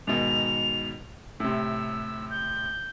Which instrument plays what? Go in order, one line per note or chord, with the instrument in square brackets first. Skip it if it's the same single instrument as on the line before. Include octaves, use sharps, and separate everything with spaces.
[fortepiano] G#2 B2 D#3 [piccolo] F7
[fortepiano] A2 C3 [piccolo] E6
[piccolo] G6